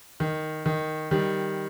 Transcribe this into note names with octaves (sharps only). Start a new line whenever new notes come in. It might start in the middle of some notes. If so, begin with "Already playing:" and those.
D#3
D#3
D#3 G3